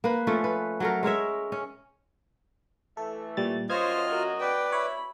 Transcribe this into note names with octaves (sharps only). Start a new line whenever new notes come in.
A#3 B4
F3 A3 C#4
B4
F#3 A3 A#4
G#3 A#4 C#5 E5
C#4
E3 A3 A4
A#2 G3 A6
F#2 F4 C5 C#5 D#5 F6 G#6
F#4 A#4
B4 D5 G5
E4 C#5 B5